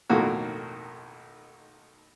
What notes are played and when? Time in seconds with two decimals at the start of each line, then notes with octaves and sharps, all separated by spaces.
0.10 B1 F2 A2 D#3 A#3 F#4